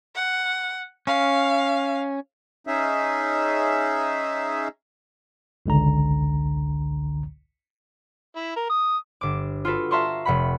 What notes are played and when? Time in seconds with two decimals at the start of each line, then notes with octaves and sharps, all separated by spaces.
0.15 F#5
1.07 C#4 F5
2.67 C#4 D#4 G#4 E5
5.66 G#1 C#2 D3 A#5
8.36 E4
8.56 A#4
8.70 D#6
9.21 G1 D6
9.65 F4 F#4 A4 B4
9.91 E5 F5 A5 A#5 C6 C#6
10.25 F1 F#5 B5